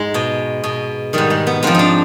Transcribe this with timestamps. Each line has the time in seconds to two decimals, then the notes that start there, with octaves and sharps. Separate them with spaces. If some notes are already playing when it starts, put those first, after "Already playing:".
Already playing: G#2 G#3
0.14 B2
0.64 B2
1.13 G#2 D#3 G3
1.30 G#3
1.47 B3
1.63 G#2 F3 C4
1.75 D4 D#4